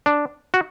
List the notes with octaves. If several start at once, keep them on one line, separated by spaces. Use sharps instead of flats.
D4
F#4